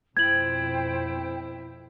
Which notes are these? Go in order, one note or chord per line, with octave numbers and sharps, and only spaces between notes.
F2 B2 E4 C5 G5 G#6 F#7